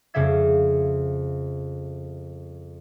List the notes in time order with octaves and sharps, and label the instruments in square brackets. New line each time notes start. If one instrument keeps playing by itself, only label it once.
[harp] F2 C#3 G3 E5 G#6